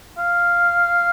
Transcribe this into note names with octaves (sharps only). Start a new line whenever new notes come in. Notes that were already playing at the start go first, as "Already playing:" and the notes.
F5